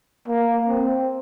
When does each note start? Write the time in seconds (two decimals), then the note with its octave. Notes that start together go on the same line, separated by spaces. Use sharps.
0.28 A#3
0.68 C4